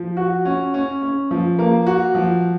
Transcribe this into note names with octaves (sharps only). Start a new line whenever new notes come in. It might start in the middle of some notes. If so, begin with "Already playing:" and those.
Already playing: F3
F#4
C#4
C#4
C#4
F3
A#3
F#4
F3